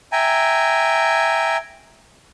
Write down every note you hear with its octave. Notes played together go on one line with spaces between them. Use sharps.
E5 G5 G#5 A#5